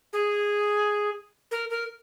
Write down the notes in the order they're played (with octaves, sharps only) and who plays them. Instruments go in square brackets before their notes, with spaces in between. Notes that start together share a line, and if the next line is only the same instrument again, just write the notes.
[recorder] G#4
A#4
A#4